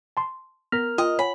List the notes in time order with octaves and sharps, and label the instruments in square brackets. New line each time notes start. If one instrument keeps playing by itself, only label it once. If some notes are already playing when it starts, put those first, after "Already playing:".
[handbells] A5 C6
[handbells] B3 A#6 B6 [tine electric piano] A#4 F6
[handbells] F4 G5 D#6 [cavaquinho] D#5
[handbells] C#5 F#5 G#5 [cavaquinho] B5